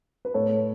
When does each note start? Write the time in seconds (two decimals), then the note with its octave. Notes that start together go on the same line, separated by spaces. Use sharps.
0.25 B4
0.34 A2 A4 C#5